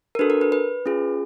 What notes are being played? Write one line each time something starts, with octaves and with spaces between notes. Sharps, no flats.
A#4
D4 F#4 A4 B4
A#4
B4
B4
C#4 F4 G#4